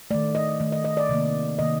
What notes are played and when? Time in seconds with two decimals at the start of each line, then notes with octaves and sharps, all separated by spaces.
0.11 D#3 A3 D5
0.35 D#5
0.60 D#3 A3
0.72 D#5
0.85 D#5
0.97 D5
1.09 C3 D#3 A#3
1.59 C3 D#3 A#3 D#5